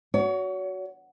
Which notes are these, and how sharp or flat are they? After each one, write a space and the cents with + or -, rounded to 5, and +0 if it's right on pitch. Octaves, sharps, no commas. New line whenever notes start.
F#4 +5 C#5 +35